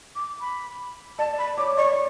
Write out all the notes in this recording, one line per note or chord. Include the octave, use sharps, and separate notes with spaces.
D6
B5
D5 A5
B5
C#5 D6
D5 C#6